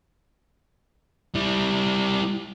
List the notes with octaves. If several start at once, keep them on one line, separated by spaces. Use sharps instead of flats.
G3 E4